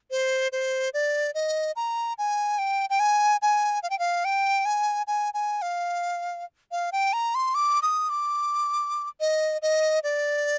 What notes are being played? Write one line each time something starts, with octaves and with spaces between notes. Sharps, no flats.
C5
C5
D5
D#5
A#5
G#5
G5
G5
G#5
G#5
F5
G5
F5
G5
G#5
G#5
G#5
F5
F5
G5
A#5
C6
D6
D#6
D6
D#5
D#5
D5